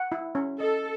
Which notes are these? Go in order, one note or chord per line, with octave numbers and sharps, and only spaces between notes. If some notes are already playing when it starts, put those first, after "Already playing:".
Already playing: F#5
E4
C#4
A4 D#5